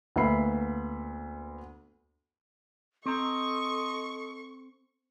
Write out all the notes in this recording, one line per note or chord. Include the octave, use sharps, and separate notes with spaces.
D2 A#3 B3 E5 B5 C7
C4 A4 D#5 A#5 C#6